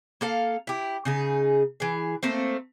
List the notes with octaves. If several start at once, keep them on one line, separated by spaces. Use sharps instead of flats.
A#3 A4 F5
E4 G4
C#3 D#4 G#4
E3 G#4
A3 A#3 C4